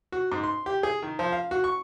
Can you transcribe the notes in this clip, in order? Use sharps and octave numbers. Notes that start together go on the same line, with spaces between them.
F#4
G#2
C6
G4
G#4
D#3
F3
F5
F#4
C#6